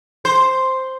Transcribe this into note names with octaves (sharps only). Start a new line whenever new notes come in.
C5